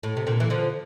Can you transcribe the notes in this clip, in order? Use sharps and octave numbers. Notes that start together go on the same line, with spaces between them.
A2
C3
A#2 D3
E3
D3 F3